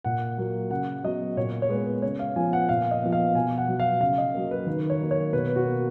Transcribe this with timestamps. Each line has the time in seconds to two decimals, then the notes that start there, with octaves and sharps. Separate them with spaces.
0.04 A#2 F#5
0.38 F#3 A#3
0.70 C#3 F#5
1.04 F#3 B3 D#5
1.37 A#2 C#5
1.62 C#5
1.69 G#3 B3 B4
2.02 C#3 C#5
2.19 F5
2.36 F3 B3 G#5
2.53 F#5
2.69 A#2 F5
2.91 D#5
3.03 F3 B3
3.12 F5
3.34 B2 G#5
3.58 F#5
3.68 F#3 B3
3.80 F5
4.00 C#3 F5
4.18 D#5
4.34 F#3 A#3
4.51 B4
4.66 D#3 B4
4.90 C#5
5.00 F#3 A#3
5.11 C#5
5.33 B2 B4
5.56 F#4
5.66 A#3